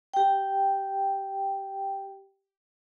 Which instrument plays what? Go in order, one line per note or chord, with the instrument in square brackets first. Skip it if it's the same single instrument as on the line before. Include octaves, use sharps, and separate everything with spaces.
[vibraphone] G4 G5